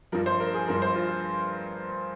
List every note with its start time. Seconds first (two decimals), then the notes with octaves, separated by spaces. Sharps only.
0.12 G2 F3 A#4
0.26 C5
0.40 A#4
0.54 G#4
0.68 G2 F3 A#4
0.82 C5
0.95 F4